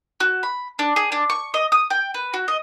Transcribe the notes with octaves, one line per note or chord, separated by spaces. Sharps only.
F#4
B5
D4
G#4
D4
C#6
D#5
D#6
G5
B4
F#4
D#5